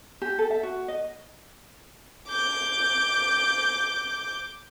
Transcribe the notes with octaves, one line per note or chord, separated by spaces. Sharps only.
G4
A4
E5
F#4
D#5
D6 G6